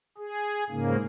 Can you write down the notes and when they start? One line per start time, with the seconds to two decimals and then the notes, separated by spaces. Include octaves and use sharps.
0.18 G#4
0.70 G#2 C#3 A#3